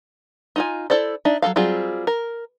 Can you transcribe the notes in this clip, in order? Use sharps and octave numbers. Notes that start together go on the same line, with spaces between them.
D#4 F4 G#5
E4 A4 C5 D5
D4 D#4 E5
F#3 C#4 A4 F5
F#3 G3 C4 F4 G#4
A#4